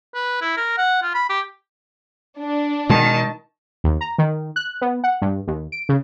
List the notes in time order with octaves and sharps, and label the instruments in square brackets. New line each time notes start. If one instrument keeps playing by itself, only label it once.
[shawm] B4
E4
A#4
F#5
F4
B5
G4
[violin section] D4
[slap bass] B2 G#3 [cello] D#3 [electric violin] A5
[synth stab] D#2
A#5
D#3
F#6
B3
F#5
G2
D#2
D7
C#3